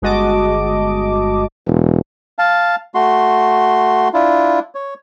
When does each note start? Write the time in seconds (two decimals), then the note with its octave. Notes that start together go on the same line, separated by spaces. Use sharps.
0.02 G1 G#3 F#4 D#5 A5 D6
1.67 E1
2.39 F5 A5
2.95 A3 F#4 C6
4.14 D4 E4 F4
4.75 C#5